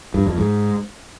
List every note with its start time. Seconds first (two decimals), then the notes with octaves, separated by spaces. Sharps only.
0.14 G2
0.26 F2
0.38 G#2